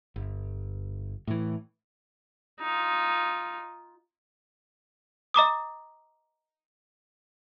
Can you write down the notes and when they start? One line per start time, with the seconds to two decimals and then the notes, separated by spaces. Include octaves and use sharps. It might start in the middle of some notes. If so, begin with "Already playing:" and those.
0.16 G1
1.27 A2 E3
2.61 D#4 F4
5.34 D#5 A#5 D6 D#6